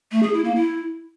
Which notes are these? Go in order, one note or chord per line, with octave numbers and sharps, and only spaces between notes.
A3
G#4
E4
A#3
E4